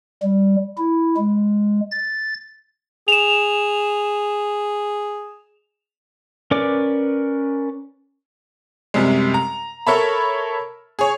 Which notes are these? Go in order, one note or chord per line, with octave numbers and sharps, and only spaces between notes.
G3
E4
G#3
A6
G#4 E7 F7
C#4 A#4 B4 D5 D6
F#2 C3 G3 G#3
A#5
A4 A#4 C#5 E5 A5 B5
G#4 C#5